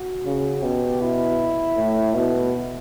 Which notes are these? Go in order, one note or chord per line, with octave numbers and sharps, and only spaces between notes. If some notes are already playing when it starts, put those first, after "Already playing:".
Already playing: F#4
C#3
B2 G4
E4
A2
B2